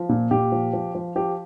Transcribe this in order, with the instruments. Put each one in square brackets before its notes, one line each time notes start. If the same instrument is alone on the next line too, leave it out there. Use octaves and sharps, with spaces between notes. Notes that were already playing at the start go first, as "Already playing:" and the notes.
Already playing: [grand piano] F3
A#2
A#2 G4
F3
F3
F3
F3 G4